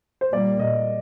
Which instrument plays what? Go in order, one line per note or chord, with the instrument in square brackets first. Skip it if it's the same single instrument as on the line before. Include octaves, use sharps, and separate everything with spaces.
[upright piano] C5
[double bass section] A#2 G3 A#3 [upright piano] D5
[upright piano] D#5